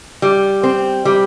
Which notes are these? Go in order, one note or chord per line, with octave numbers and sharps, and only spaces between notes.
G3
C4
G3